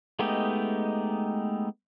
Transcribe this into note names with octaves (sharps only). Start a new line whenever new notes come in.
G#3 A3 B3 D#4 G4